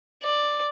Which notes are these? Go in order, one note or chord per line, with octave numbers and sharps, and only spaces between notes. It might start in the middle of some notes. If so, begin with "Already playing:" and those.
D5